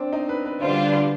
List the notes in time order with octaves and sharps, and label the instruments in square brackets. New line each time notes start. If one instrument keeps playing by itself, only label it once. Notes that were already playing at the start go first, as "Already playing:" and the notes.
Already playing: [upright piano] C4 D4
D#4
B4
B4
[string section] D3 G3 D4 F4 [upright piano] C5
[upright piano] B4